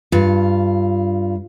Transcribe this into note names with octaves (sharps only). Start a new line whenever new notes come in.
G2 F4